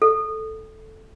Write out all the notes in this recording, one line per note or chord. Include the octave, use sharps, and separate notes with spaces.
A4